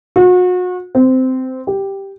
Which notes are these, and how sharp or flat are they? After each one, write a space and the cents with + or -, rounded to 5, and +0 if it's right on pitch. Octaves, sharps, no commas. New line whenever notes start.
F#4 -35
C4 -15
G4 +0